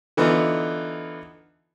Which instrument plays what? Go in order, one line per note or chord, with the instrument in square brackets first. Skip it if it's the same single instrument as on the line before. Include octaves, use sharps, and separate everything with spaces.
[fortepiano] D3 E3 B3 D#4 F4